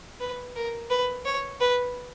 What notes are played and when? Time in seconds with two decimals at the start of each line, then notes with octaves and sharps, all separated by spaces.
0.20 B4
0.56 A#4
0.90 B4
1.25 C#5
1.61 B4